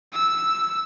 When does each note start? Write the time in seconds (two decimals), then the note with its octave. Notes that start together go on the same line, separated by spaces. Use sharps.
0.13 E6